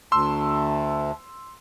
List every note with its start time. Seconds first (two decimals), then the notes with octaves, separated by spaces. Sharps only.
0.12 D2 A5 C6 E6